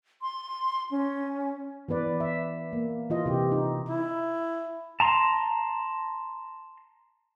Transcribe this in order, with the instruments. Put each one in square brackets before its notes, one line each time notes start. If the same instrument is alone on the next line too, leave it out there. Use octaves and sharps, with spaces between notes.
[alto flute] C6
C#4
[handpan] E3 B3 B4 D5
E5
A#3
E3 F4 D#5
C3 G4
D#4
[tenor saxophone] E4
[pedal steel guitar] A5 A#5 C6